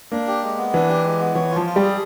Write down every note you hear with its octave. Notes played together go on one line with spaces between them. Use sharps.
A#3 D4
G4
G#3
B3
E3 D4
G4
G#3
B3
E3 C#5
F4
F3
F4
G3
G#4